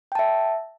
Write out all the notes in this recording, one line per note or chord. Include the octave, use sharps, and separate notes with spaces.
E5 G5 A5